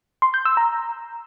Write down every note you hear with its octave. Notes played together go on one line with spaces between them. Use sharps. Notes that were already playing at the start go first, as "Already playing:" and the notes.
C6
G6
E6
A#5